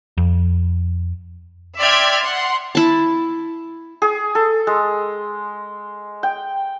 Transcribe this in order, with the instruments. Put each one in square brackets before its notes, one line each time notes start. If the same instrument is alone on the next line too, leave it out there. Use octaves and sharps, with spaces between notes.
[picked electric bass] F2
[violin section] D5 E5 G5 C6 F6 G#6
F#5 C6
[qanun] E4 A5
[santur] G#4
A4
G#3
G5